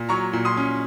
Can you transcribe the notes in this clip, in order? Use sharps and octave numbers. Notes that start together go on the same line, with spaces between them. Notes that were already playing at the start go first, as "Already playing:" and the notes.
Already playing: A#2
F#3 A#5 C#6
A#2
C6 D#6
C#4